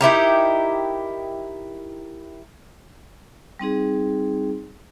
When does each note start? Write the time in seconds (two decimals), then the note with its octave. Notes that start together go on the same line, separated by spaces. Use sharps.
0.01 D#4 E4 G4 A#4
3.59 G3 C4 D#4 G#4